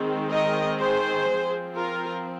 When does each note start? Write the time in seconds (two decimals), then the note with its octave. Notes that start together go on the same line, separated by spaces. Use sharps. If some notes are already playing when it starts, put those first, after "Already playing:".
Already playing: D#3 G#3 C4
0.31 A#4 D#5
0.80 G#4 C5
1.28 C4
1.33 F3
1.75 F4 A#4